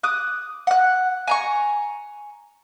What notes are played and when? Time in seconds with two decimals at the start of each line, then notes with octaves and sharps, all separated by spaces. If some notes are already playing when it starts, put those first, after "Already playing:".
0.03 D6 D#6 F#6
0.67 F#5 F#6
1.28 G#5 A#5 C#6